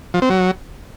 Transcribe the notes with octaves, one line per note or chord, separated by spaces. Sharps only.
F3
C4
F#3